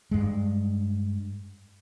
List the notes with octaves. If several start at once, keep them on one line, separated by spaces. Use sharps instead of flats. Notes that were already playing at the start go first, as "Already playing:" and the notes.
G2 G#3